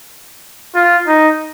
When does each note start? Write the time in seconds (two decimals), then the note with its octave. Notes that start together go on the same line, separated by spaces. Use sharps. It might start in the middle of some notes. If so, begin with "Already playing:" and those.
0.75 F4
1.07 D#4